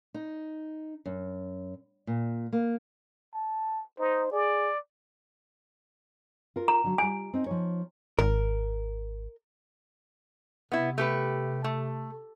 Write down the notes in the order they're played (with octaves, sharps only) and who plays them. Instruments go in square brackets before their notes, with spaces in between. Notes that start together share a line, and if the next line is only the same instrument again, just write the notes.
[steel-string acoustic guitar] D#4
F#2
A#2
A#3
[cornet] A5
[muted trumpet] D#4 [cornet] C5
[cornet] G#4 [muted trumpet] D5
[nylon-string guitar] F4 A#4
[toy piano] A#5
[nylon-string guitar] D3 F#3
[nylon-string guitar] G3 F4 [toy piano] G#5
[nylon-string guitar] C4 D#4
F3 D#4 C#5
[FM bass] G#1 [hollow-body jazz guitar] A#4
[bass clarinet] C3 [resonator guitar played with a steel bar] B3 E4
[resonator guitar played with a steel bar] A3 G4 B4
A3